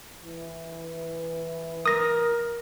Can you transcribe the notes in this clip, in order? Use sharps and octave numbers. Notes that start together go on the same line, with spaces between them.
E3
A#4 D#6 A#6